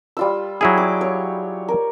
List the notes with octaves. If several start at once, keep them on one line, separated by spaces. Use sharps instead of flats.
G3 F4 E6
F#3 E4 G#4 G5
D6
C#5
A#4